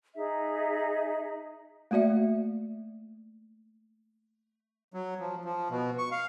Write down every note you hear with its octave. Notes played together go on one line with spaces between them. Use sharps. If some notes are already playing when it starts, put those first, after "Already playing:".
D#4 G#4 E5
A3 A#3 F#4 D5 E5
F#3
F3
F3
B2
C#6
F5